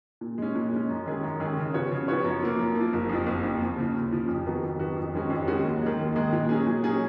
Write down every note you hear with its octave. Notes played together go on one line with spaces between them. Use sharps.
A#2
G#3 C#4
A#2
G#3 C#4
F#2
D#3 G#3 C#4 G#4
F#2
D#3 G#3 C#4 G#4
C#3
F3 B3 F#4 C#5
C#3
F3 B3 F#4 C#5
F#2
F3 A#3
F#2
A#3
F3
F#1
F2 F3
F#1
F2 F3
D#2
C#3 F3
D#2
C#3 F3
F2
D#3 F#3 B3 F#4
F2
D#3 F#3 B3 F#4
F2
D#3 G#3 C#4 F#4
F2
D#3 G#3 C#4 F#4
D#2
D#3 G#3
D#2
D#3 G#3
A#2
F#3 C#4 G#4
A#2
F#3 C#4 G#4